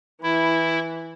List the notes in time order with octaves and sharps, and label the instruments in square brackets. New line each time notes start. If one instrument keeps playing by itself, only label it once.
[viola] E3 [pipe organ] E4